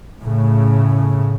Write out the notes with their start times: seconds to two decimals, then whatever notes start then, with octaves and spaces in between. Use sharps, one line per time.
0.21 A2 C#3